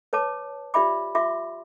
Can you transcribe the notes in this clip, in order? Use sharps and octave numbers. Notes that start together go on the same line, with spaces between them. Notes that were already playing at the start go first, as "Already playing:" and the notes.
B4 C#5 A5 D6
F4 G4 D5 E5 B5 D6
F4 E5 C6 D6